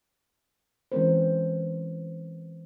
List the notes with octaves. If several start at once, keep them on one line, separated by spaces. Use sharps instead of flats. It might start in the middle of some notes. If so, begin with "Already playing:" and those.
E3 G#3 C4 C#4 A#4 C5